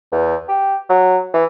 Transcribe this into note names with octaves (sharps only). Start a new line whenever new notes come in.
E2
G4
F#3
E3